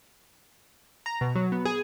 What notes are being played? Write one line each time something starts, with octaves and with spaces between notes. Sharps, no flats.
A#5
B2
F#3
B3
G#4